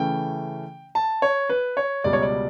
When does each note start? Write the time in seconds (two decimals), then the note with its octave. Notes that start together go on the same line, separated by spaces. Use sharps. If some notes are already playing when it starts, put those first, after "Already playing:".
Already playing: C#3 E3 A3 C#4 G5
0.95 A5
1.22 C#5
1.50 B4
1.77 C#5
2.04 C#2 B2 G3 D5
2.13 C#5
2.23 D5